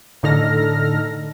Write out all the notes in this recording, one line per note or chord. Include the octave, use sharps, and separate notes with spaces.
A2 D3 D#4 A4 F6 A#6